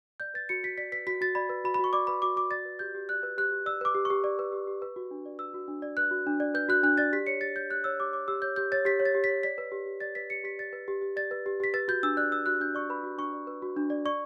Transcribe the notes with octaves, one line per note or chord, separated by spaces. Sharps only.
D5 G6
B4 A6
F#4 C#7
F#4 B6
D5 B6
B4 B6
F#4 B6
F#4 A6
D5 B5
B4
F#4 B5
B5
F#4 C#6
D5 D6
B4 B5
F#4 D6
F#4 D6
D5 A6
B4
G4 G6
G4
D5 F#6
B4
G4 F#6
G4
D5 E6
B4 D6
G4
C#6
G4
D5
B4
G4
G4
B4
F#4
D4
D5
B4 E6
F#4
D4
D5
B4 F#6
F#4
D4
D5
B4 G6
F#4 F#6
D4 F#6
D5 A6
G4 B6
C#5 C#7
G4 A6
C#5 G6
G4 F#6
C#5 E6
G4 D6
C#5 D6
G4 E6
C#5 G6
G4 G6
C#5 A6
G4 B6
C#5
A6
G4
B6
C#5
D5 B6
B4
G4
G4
D5 A6
B4 B6
G4 C#7
G4 B6
D5 A6
B4
G4
G4
D5 A6
B4
G4
G4 B6
B4 A6
F#4 G6
D4 E6
D5 F#6
B4 E6
F#4 F#6
D4 G6
D5 C#6
B4 B5
F#4
D4 C#6
D5
B4
F#4
D4
D5
D5 C#6